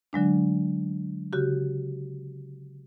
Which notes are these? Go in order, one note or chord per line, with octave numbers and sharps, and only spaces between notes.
D3 F#3 G#3 D4
C#3 F#4 G4